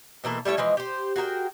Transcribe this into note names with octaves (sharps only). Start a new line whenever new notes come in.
B2 E3 A#3 A4
G3 A3 E4 C#5
E3 F3 G#3 D#5
G4 C5
F#4 G#4 A#4 G5